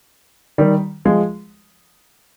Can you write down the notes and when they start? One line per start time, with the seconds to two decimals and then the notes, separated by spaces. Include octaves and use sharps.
0.58 D#3 G3
1.05 F3 G#3